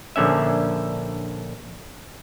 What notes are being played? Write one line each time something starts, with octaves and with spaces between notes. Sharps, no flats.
A#1 D3 C#4 E5